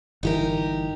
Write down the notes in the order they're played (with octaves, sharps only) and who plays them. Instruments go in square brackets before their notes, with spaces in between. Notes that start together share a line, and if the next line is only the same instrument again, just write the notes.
[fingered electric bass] G1 E3 [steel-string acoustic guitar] D#4 G4 A#4